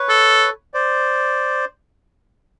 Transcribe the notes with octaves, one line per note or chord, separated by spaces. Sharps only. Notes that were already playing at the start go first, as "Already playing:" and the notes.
Already playing: B4 C#5
A4
C5 D5